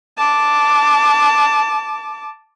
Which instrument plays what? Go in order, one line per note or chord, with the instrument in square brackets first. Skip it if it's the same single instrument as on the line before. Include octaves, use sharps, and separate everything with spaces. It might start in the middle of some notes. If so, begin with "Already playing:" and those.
[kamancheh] A5 D6